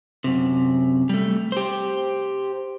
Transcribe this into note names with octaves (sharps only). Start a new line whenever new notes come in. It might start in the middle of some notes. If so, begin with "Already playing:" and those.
F#2 C3
G3 A3
G4 C5